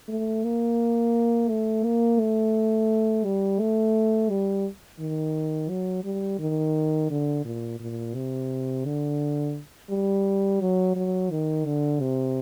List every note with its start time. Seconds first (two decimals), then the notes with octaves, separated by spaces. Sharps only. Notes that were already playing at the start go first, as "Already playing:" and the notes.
0.08 A3
0.44 A#3
1.49 A3
1.84 A#3
2.19 A3
3.25 G3
3.60 A3
4.30 G3
5.00 D#3
5.69 F#3
6.04 G3
6.39 D#3
7.10 D3
7.45 A#2
7.80 A#2
8.14 C3
8.85 D3
9.90 G3
10.61 F#3
10.96 F#3
11.31 D#3
11.66 D3
12.00 C3